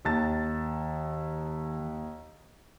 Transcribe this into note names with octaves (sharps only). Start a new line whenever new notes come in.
D#2 D#3 A5 A6